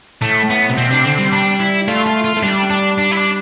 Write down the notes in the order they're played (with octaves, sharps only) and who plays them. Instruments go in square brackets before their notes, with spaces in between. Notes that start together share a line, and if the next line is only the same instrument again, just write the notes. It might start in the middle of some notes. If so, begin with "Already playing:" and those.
[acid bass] A2 [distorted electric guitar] A3
[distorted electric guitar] B3
[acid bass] C3
[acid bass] B2 [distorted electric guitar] C4
[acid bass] C3 [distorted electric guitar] D4
[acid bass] D3 [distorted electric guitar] C4
[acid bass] G3
[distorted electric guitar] D4
E4
[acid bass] A3 [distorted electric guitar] F4
[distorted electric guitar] F4
F4
[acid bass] A3
[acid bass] G3 [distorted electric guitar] D4
[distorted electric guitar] D4
D4
E4
D4